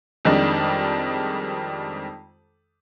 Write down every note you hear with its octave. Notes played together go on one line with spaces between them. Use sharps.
F2 D#3 G3 G#3 D4